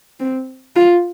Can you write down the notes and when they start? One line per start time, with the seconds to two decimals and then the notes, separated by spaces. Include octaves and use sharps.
0.20 C4
0.76 F4